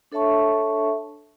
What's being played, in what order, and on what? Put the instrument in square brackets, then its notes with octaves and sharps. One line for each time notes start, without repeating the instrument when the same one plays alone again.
[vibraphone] D4 A4 C#5 E5 A5 C#6